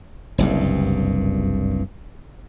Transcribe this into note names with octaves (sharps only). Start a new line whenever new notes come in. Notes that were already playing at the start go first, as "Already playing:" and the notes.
F#1 C2 G2